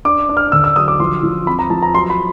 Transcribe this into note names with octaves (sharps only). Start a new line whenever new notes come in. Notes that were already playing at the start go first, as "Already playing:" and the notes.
D4 D6
D4
F6
D3 E6
E6
F#3 D#6
D6
F3 C6
F3
C4 B5
A#5
F3 A5
A#5
F#3 C6
B5